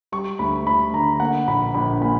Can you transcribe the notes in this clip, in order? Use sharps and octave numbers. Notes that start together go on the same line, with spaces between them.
G3 C#6
D2 B5
D2 B5
D3 A#5
A#3 F#5
A#1 B5
A#1 B5
A#2 B5